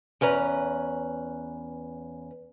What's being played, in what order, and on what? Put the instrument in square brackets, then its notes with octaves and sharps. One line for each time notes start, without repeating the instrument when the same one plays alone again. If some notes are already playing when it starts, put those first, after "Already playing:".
[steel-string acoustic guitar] E2 C#4 B4 A#5